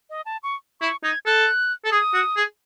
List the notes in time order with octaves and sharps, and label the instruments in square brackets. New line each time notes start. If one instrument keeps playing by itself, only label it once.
[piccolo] D#5
A5
C#6
[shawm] E4 [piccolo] C#6
[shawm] D#4 [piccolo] G#6
[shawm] A4 [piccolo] F#6
[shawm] A4
[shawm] G#4 [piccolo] D#6
[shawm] F#4
G#4